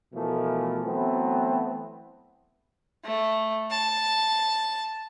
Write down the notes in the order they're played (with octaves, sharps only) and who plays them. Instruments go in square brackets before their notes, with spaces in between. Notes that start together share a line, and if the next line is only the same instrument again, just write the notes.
[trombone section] B2 E3 F3 A3 A#4
E3 F#3 A3 B3 C4
[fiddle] A3
A5